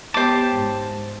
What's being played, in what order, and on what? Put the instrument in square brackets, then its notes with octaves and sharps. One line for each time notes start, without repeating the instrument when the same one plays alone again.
[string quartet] B3 G4 C#5 [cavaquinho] C5 D6 [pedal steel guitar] A5
[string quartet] G#2